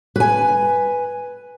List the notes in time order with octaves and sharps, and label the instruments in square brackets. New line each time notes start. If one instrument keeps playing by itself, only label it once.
[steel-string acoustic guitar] B4 G#5